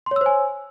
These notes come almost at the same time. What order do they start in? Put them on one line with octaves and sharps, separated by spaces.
C6 C#5 E6 C5 G#5